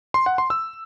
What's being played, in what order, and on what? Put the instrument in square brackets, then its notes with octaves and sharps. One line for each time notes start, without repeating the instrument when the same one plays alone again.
[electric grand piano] C6
F#5
C6
E6